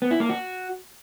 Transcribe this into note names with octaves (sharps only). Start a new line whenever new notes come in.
B3
E4
A#3
F#4